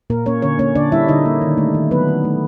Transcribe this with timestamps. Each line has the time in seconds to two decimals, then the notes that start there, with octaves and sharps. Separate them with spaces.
0.10 A#2 A#3 A#4
0.26 A#3 C#4 C#5
0.42 D3 C#4 C#5
0.59 A#3 C#4 C#5
0.75 D3 D4 D5
0.92 G3 E4 E5
1.08 D3 D#4 D#5
1.26 A#3
1.42 D#3
1.58 A3
1.74 D#3
1.91 F#3 B3 B4
2.08 D#3
2.24 A3